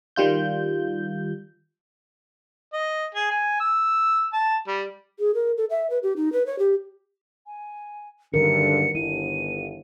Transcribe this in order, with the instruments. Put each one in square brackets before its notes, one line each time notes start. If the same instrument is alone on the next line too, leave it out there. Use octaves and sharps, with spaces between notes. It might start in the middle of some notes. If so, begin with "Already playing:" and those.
[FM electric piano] D#3 G3 F4 G6
[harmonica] D#5
G#4
G#5
E6
A5
G3
[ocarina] G#4
A#4
A4
E5
B4
G4
D#4
B4
C#5
G4
[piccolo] G#5
[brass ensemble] F#1 G2 D3 [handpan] D#3 A#4 [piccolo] C#7
[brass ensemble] G1 [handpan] E4 [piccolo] D#7